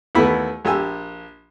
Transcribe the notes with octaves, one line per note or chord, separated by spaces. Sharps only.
D#2 E3 A3 B3 E4 B5
A#1 G4 G#5 E6